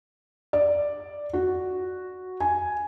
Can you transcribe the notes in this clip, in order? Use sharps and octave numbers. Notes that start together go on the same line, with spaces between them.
D5
F#4
G#5